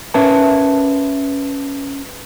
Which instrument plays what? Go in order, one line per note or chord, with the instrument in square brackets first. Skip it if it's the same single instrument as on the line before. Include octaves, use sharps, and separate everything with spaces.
[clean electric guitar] C#4 A#4 B4 E5 A5